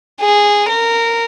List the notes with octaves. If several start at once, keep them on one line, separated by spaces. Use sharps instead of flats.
G#4
A#4